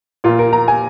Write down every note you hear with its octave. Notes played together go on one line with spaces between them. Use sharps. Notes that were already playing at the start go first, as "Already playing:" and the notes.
A#2 A#3 F4
A#4
A#5
G#5